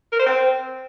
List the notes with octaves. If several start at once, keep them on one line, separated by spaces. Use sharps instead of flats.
A#4
C5
C4